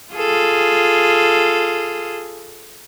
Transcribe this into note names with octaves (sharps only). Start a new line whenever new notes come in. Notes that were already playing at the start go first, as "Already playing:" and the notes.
F4 G#4 A4